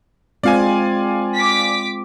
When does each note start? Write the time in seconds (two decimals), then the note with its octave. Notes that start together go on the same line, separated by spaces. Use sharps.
0.44 G#3 C4 F4 D5 F5 G#5
1.36 D6 B6